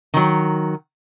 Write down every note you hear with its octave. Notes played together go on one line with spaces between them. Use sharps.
D#3 F#3